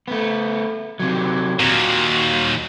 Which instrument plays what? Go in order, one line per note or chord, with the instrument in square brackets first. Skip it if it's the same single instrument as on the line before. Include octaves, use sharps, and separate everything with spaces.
[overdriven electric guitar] A3 B3
C3 F#3
[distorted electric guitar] D#2 A#2 [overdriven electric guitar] F#4